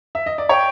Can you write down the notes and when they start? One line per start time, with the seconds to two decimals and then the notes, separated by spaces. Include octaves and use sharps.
0.15 E5
0.26 D#5
0.38 D5
0.49 C#5 G5